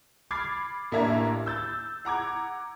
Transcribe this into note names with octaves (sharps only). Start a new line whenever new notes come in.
B5 D6 F6 G#6 A6 C7
A1 A#3 D4 E5 A#5 G#6
E6 G6 A6
F#5 A#5 D6 G#6